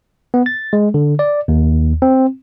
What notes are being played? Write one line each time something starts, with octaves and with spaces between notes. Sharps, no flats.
B3
A6
G#3
D3
D5
D#2
C4